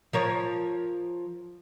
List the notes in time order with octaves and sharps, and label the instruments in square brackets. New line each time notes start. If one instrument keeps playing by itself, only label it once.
[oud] F3 A#4 C#5